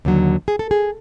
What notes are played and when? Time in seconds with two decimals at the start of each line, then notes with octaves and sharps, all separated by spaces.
0.05 D#2 D3 F#3
0.48 G#4
0.59 A4
0.71 G#4